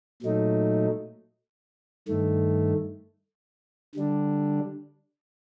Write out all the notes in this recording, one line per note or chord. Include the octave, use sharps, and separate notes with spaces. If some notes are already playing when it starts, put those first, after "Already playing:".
A#2 F#3 A3 D#4
G2 D#3 A3
D3 G3 D4